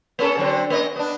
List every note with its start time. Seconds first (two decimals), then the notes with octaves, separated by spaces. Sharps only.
0.19 A#3 C#4 A4
0.37 D3 F#3 C4
0.70 A#3 C#4 D#5
0.96 B3 D4